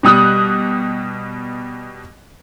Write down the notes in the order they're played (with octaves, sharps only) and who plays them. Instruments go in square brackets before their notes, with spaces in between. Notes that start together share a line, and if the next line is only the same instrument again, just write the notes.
[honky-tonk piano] B2 G3 D#6 F#6